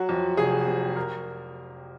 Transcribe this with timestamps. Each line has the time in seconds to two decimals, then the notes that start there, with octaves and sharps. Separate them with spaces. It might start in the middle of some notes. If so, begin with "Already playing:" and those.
Already playing: F#3 F#4
0.09 F2
0.37 F1 G#4
0.67 C3
0.96 A#4